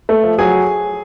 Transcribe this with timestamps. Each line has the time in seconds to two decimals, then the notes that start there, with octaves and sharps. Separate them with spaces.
0.09 A3
0.24 F3
0.38 F#3 G#4 G#5